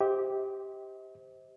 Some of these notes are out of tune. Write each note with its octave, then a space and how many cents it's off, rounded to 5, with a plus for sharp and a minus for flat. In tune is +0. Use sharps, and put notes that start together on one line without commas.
G4 +0 C5 +0 D#5 +45